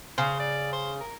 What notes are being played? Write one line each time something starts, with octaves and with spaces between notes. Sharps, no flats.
C#3 C5
D5
C5
A#4